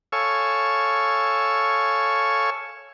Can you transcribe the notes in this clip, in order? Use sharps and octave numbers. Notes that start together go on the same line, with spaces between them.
A4 C#5 F5 G#5 C#6 E6